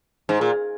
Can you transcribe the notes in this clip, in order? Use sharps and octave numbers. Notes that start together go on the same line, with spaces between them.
G#2
A#2